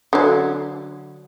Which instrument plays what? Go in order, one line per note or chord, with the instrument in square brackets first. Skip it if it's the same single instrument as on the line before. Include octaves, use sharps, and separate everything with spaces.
[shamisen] D3 F#3